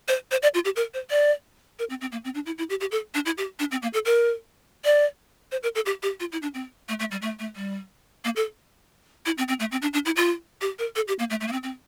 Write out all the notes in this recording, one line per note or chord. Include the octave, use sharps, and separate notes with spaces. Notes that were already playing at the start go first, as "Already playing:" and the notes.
C5
C5
D5
F4
G4
A#4
C5
D5
A#4
C4
C4
A#3
C4
D4
E4
E4
G4
G4
A4
D4
E4
G4
D4
C4
A#3
A4
A#4
D5
C5
A#4
A4
G4
G4
F4
E4
D4
C4
A3
A3
G3
A3
A3
G3
A#3
A4
E4
C4
C4
A3
C4
D4
D4
E4
F4
G4
A#4
A4
G4
A#3
A3
A3
A#3
C4
C4